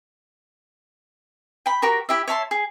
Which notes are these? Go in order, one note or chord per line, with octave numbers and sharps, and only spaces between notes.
G5 B5
F#4 G4 A#4 C#6
E4 G4 E5
C#5 E5 A5 C6
G#4